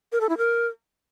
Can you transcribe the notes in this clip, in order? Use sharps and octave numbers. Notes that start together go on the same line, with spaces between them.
A#4
A4
E4
A#4